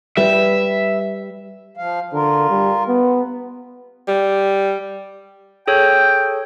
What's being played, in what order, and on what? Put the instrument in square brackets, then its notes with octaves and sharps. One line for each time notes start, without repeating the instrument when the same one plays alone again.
[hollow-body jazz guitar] G3 [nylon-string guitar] B4 [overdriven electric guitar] E5
[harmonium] F3 F5
[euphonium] D3 [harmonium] F4 A#4
[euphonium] G3
B3
[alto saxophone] G3
[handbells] G#4 A4 C#5 [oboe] G5